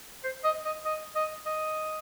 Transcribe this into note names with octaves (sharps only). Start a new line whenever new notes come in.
C5
D#5
D#5
D#5
D#5
D#5